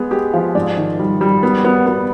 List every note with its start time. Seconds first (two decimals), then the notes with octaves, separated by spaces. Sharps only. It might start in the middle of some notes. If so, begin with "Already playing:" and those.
Already playing: G#3 B3 G#4
0.11 G#3 G4
0.34 F3
0.55 G#2 D5
0.77 D#3
0.99 G3
1.21 G3
1.43 B3
1.64 B3
1.86 B3